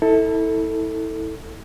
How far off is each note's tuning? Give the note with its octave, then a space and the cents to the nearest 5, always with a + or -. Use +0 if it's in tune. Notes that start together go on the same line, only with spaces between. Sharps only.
E4 -30 A4 +10